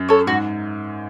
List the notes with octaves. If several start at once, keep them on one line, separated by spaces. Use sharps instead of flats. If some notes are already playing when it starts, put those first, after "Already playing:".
Already playing: F#2
A4 C#5
G#2 F#4